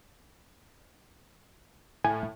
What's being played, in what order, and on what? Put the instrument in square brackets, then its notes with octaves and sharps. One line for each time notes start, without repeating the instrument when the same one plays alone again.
[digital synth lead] A2 [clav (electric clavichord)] G#5